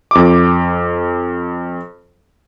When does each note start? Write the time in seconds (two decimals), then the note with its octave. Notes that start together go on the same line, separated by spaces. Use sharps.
0.11 F2 D6